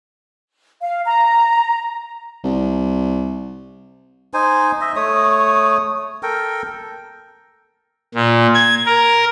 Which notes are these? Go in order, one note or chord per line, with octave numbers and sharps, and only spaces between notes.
F5
A#5
C2
D#4 C5 G#5
D#5 E5
A3 C#5 D#6
A4 A#4 G5
A#2
G#6
A#4